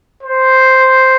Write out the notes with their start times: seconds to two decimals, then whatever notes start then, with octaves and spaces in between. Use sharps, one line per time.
0.23 C5